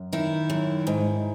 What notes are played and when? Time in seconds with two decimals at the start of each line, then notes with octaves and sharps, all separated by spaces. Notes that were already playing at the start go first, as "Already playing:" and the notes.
Already playing: F#2
0.13 D#3 E4
0.50 F#2
0.87 G#2